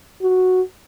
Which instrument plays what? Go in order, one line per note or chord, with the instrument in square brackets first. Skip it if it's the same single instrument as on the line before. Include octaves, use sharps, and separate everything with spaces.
[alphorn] F#4